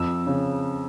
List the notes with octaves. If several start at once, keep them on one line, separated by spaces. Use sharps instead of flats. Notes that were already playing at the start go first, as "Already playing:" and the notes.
Already playing: F2 E6
C#3